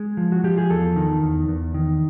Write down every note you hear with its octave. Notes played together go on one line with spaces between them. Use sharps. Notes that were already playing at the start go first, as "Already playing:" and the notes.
Already playing: G#3
F3
F#4
F3 G4
G#4
E2 A4
D#3
E2
E2
D#3